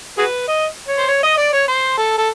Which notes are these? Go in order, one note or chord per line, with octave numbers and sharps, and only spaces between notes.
F#4 G#4 B4
D#5
C#5
C5
C#5
D#5
D5
C#5
C5
A4
A4